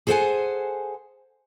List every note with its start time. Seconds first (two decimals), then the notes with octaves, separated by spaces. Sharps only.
0.07 G#4 A4 C5 C#5 F#5 G#5